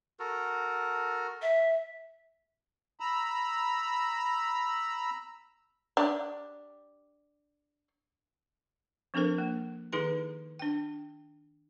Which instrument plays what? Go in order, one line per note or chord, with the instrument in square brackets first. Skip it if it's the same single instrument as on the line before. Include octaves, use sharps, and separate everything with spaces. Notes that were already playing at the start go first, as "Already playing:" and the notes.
[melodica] F#4 A4 A#4
[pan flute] E5
[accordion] A#5 B5 E6
[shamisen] D4 G4
[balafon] F3 C4 D4 A4 A#4 C5
A#3
D#3 D#4 E4 G#4 B4 C6
D4 G5